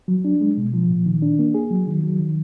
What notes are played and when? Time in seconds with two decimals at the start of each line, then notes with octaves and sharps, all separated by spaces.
0.08 F#3
0.25 D4
0.41 G#3
0.58 B2
0.73 F3
0.90 A#2
1.06 D#3
1.22 D4
1.39 A#3
1.54 G#4
1.70 F#3
1.87 D#3
2.03 F#3
2.19 D#3